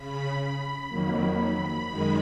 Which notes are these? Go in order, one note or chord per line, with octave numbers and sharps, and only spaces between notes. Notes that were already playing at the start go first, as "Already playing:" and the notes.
Already playing: C#3 B5
B5
F2 D#3 F#3 A#3 B5
F#2 D#3 G#3